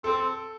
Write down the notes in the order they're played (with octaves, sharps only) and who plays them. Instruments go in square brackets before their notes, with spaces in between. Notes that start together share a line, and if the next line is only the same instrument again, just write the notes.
[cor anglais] C4 [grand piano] A4